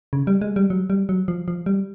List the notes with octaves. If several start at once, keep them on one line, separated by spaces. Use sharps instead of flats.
C#3
G3
G#3
G3
F#3
G3
F#3
F3
F3
G3